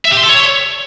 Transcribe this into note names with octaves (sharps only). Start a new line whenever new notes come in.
E5
G4
C6
A4
C#5